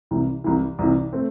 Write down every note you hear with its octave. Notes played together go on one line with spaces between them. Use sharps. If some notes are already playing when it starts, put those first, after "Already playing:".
C2 C3 E3
C2 C3 E3
C2 C3 E3
A3 C4